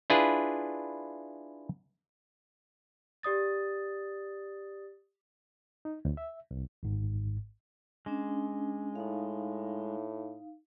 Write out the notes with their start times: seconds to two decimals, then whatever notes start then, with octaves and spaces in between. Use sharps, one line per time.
0.10 D4 E4 F4 G#4 B4
3.23 G4 D5 D#6 A6
5.85 D#4
6.05 D2
6.17 E5
6.51 C2
6.83 G#1 G#2
8.06 G#3 C#4 D4
8.95 A2 D#4 F5